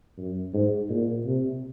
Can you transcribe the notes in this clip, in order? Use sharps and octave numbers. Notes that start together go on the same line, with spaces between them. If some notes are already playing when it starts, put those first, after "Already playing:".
F#2
G#2
A#2
C3